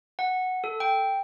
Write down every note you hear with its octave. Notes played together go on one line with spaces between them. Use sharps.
F#5
A4
G5